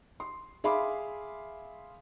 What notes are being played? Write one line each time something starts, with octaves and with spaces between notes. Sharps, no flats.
C6
G#4 E5 F5 B5 C6 D6